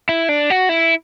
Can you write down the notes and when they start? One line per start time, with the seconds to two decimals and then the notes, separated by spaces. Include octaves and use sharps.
0.09 E4
0.29 D4
0.50 F#4
0.69 E4